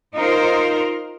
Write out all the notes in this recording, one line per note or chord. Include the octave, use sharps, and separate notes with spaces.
D#4 F4 A#4 C5